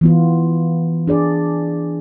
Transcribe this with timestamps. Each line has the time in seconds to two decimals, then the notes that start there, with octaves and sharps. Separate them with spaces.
0.01 E3 B3 F4
1.08 D4 G#4 D5